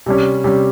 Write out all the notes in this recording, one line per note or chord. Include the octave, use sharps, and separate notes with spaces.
C3 G3 C#4
C3 G3 C#4